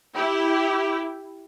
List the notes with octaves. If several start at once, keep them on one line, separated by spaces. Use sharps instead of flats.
E4 G4